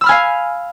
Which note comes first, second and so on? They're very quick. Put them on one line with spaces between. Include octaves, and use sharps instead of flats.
E6 B5 F6 G#5 F5